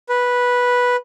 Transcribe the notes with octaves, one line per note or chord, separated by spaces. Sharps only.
B4